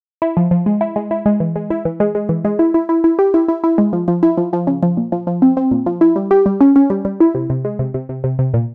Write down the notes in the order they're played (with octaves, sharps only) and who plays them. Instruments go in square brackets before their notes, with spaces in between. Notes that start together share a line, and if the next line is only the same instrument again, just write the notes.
[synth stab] E4
F3
F3
G#3
E4
G#3
E4
G#3
E3
G#3
E4
E3
G#3
G#3
E3
G#3
E4
E4
E4
E4
G4
E4
E4
E4
G#3
F3
F3
E4
F3
F3
C#3
F3
A#2
F3
F3
C4
C4
A#2
F3
E4
G3
G4
G3
C#4
C#4
G3
G3
E4
C3
C3
G#3
C3
C3
C3
C3
C3
A#2